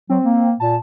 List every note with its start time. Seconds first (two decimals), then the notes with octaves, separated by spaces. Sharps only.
0.10 F#3 C4
0.23 A#3
0.60 A#2 A5